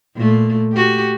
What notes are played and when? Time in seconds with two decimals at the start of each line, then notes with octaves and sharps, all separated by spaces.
0.15 A#2 A3
0.73 F#4 G4